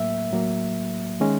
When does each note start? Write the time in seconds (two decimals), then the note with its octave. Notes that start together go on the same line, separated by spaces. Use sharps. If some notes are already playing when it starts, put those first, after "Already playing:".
Already playing: A2 F#3 A#3 E5
0.30 A2 F#3 A#3
1.20 D#3 G#3 C#4